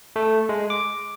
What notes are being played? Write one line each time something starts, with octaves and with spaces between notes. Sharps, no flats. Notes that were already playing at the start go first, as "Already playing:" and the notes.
A3
G#3
D6